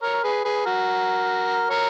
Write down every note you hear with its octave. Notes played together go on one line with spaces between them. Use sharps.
A#4 C#5
G#4 B4
G#4 B4
F#4 A#4
A#4 C#5